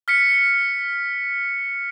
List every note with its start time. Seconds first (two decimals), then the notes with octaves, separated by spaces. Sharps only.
0.08 F6 B6 C#7